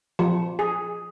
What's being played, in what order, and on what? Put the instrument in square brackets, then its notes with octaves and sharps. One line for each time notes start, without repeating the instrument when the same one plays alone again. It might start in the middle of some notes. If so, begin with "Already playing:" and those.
[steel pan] F3
G#4